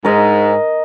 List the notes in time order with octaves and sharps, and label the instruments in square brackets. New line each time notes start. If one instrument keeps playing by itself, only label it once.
[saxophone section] G#2 [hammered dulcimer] A#4 D#5